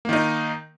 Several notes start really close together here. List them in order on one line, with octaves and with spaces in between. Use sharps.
A#3 D#3 D#4